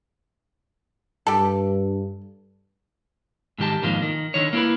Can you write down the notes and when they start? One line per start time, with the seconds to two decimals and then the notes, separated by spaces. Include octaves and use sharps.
1.27 G2 G4 A4
3.58 G#2 D#3 G4 A5
3.82 F2 G#2 D#3 A#3 F4
4.02 D#3
4.34 D3 D#3 C#5
4.53 A#3 E4 A#4 B4